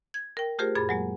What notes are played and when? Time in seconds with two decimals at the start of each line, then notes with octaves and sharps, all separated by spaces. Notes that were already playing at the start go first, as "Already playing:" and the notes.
0.14 G#6
0.37 A#4 G5
0.59 A3 F4 G4 G#4 A#4 C5
0.76 F#2 A#2 G#4 B5 A6
0.89 F#3 G#3 A#3